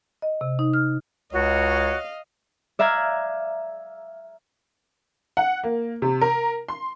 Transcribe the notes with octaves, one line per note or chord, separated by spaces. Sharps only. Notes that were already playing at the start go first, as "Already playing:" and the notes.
D#5
C3
D#4
F6
C#2 F#4 C#5 D#5 F5
D5 E5 F5 A#5 F#6 G#6
F#5
A#3
C3
A#4
C6